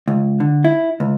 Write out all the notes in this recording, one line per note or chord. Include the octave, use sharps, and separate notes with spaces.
C#2
D3
E4
C#2